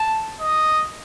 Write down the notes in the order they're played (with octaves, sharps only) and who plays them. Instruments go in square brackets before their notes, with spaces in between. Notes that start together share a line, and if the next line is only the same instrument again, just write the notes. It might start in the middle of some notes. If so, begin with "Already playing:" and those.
Already playing: [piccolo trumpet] A5
D#5